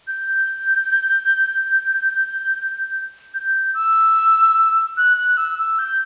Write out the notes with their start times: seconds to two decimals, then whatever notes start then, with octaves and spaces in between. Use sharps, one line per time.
0.08 G6
3.34 G6
3.74 E6
4.97 F#6
5.17 F#6
5.37 E6
5.59 E6
5.79 G6